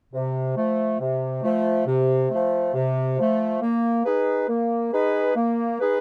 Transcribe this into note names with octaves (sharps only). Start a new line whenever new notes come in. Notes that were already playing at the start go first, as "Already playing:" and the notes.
C3
F3 A3
C3
F3 A3
C3
F3 A3
C3
F3 A3
A#3
D#4 G#4 B4
A#3
D#4 G#4 B4
A#3
D#4 G#4 B4